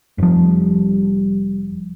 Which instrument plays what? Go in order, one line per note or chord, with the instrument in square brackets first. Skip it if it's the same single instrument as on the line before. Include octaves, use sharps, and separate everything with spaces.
[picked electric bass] F1 F3 [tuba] G3